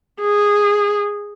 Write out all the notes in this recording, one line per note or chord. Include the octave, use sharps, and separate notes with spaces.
G#4